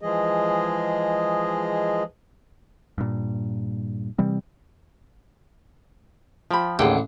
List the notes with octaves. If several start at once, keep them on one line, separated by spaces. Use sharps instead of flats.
E3 F3 G#3 G#4 D#5
G2 A#2
C3 E3 G3 C4
F3 G5 B5
A1 D#2 D3 G#4 F#5 G5